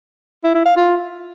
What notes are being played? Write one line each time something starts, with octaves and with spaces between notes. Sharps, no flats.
E4
E4
F5
F4